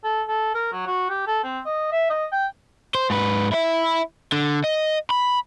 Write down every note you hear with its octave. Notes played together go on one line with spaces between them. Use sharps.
A4
A4
A#4
F#3
F#4
G4
A4
C4
D#5
E5
D#5
G5
C5
G#2 B4
E4 E5
D3
D#5
B5